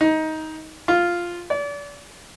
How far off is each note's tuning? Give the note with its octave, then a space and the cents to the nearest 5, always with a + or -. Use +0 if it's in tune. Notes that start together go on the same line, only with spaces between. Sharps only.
D#4 +15
F4 +0
D5 -35